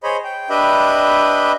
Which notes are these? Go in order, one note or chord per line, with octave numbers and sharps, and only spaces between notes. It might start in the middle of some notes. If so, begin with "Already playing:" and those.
G#4 C5 C#5 D#5 B5
G5
D4 G4 B4 D#5 E5 B5